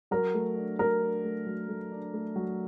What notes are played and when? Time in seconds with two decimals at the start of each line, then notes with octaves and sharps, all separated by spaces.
0.11 F#3 A#4
0.34 A3
0.57 D4
0.79 F#3 A#4
1.02 D4
1.24 A3
1.47 F#3
1.69 A3
1.92 D4
2.14 A3
2.36 F#3